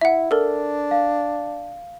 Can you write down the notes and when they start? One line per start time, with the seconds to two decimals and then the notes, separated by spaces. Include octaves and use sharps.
0.01 E4 E5 F#5
0.31 D4 A4 A#4
0.91 F5